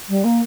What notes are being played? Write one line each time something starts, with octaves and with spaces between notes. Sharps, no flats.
G3
A#3